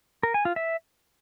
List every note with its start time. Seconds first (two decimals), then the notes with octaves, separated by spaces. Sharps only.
0.23 A#4
0.34 G#5
0.45 F4
0.56 E5